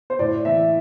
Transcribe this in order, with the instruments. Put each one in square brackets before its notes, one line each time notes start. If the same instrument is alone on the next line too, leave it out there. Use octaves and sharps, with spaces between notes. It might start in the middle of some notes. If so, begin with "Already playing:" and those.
[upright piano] C5
A2 D5
E3 E5